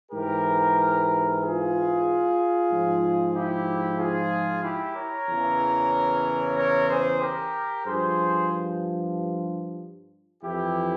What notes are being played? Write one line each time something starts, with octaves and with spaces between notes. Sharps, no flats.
G#2 E3 G4 A#4
F4 G#4
G#2 F3
E4 G4
F4 G#4
E4 G4
A#4 C#5
E2 C#3 E3
A#4 C#5
G#4 C5
G4 A#4
G2 F3 G#4 C5
F2 E3 E4 G4